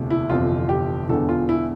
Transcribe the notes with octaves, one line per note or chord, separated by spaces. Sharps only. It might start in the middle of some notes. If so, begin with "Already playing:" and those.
Already playing: E1 D2 C3
E4
G1 F2 C3 E3 F4
G4
E1 E2 D3 A4
F4
E4